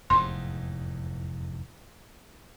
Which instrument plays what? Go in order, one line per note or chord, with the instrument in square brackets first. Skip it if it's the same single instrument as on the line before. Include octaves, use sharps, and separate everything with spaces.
[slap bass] F1 E2 G#2 [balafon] C6